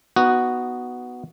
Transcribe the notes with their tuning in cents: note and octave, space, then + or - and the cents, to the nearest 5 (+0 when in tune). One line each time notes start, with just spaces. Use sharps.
B3 +0 D#4 +0 F#4 +0